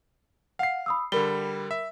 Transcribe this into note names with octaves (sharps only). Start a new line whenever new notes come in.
F5 F#5 C7
B5 D#6 E6
D3 G3 A#4 B5 G7
E5